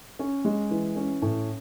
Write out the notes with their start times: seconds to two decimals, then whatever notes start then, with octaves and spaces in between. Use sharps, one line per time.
0.19 C#4
0.45 G#3
0.71 E3
0.96 C#4
1.22 A2